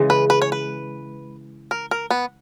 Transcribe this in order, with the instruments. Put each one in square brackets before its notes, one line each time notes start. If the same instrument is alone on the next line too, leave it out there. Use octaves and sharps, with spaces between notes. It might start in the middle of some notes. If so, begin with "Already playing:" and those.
Already playing: [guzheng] C#3 E3 G#3
[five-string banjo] B4
B4
C#5
B4
A#4
A#4
B3